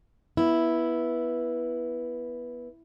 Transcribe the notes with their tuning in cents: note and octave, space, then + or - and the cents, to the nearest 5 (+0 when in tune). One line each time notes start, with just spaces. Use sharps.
B3 -15 E4 +0